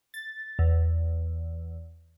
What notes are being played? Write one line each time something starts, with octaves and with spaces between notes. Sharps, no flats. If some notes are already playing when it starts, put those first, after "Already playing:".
A6
E2